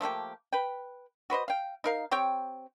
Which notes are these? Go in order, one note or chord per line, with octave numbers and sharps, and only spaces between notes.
F3 A3 A#3 G4
B4 G5
F#4 B4 C5 D#5
F5 G5
D#4 A#4 F5
C4 G4 C#5 G5